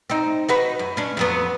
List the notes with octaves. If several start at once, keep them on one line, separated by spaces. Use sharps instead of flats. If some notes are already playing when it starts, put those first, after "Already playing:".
C4 D#4
D#4 F#4 B4
F#2
C#4 D4
F2 F#3 B3